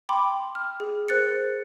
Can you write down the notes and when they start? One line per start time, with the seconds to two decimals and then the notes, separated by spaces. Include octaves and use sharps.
0.09 G5 B5 C6 D6
0.55 F6
0.80 G#4
1.08 A#4 C5 F#6 A6 C#7